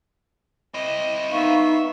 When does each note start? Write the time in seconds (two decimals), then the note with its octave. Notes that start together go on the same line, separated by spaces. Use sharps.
0.74 C4 E4 D#5
1.31 B3 D#4 E5 F5 C#6